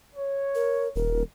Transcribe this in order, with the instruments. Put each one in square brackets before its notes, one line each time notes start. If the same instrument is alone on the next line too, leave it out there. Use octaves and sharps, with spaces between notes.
[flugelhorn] C#5
[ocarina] A#4
[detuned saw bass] D#1 [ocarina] A#4